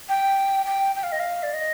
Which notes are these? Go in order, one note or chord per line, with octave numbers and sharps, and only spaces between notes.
G5
G5
G5
F5
D#5
F5
D5
D#5